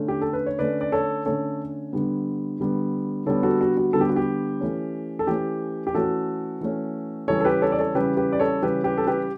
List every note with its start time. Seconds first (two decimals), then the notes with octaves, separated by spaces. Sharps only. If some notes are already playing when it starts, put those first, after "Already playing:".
Already playing: D3 A3 C#4
0.08 G4
0.21 A4
0.33 B4
0.46 C#5
0.59 D3 A3 C#4 B4 D5
0.81 D5
0.92 A4 C#5
1.25 D3 A3 C#4 A4 C#5
1.93 D3 G3 B3
2.60 D3 G3 B3
3.26 D3 G3 B3 A4 C#5
3.43 F#4 A4
3.61 F#4
3.77 F#4
3.93 D3 G3 B3 A4
4.01 G4
4.09 F#4
4.16 G4
4.60 E3 A3 C#4
5.19 A4
5.27 E3 A3 C#4 G4
5.87 G4
5.95 E3 A3 C#4 F#4 A4
6.61 E3 A3 C#4
7.28 C#3 E3 G3 C#4 A4 C#5
7.41 A4
7.45 G4 B4
7.62 A4 C#5
7.72 D5
7.79 A4 C#5
7.95 C#3 E3 G3 C#4 G4 B4
8.17 G4 B4
8.32 D5
8.39 A4 C#5
8.62 C#3 E3 G3 C#4 G4 B4
8.84 G4 B4
8.98 A4
9.07 G4 B4